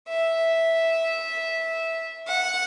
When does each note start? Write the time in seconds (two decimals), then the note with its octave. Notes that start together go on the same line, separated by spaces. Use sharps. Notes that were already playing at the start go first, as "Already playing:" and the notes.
0.09 E5
2.27 F#5